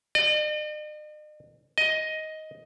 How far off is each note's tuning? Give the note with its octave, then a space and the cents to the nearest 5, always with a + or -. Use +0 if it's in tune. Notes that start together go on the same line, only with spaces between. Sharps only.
D#5 -45
D#5 +10